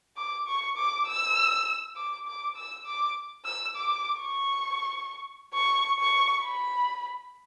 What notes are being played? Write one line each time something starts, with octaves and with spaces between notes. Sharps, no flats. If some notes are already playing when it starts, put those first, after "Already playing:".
D6
C#6
D6
E6
D6
D6
E6
D6
E6
D6
C#6
C#6
C#6
B5